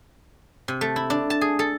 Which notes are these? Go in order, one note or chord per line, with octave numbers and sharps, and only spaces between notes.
C3
A3
E4
D4
A5
G#4
A4